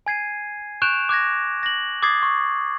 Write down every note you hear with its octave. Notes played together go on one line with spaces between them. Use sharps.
G#5 G#6 C7 D#7
C#6 F#6 G6 D7 E7 F7
D6 F#6 G#6 A#6
A#6 F#7
D6 D#6 G#6 A6 C7
C#6